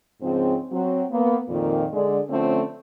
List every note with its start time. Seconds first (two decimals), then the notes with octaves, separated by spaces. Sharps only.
0.22 G#2 C#3 F3 C4
0.72 F#3 C4
1.11 A#3 B3
1.49 F2 A#2 D#3
1.93 D3 G#3 D5
2.30 D3 F3 A3 C4 C#4